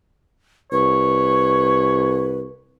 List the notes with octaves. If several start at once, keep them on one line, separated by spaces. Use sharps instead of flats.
C2 B4 C#5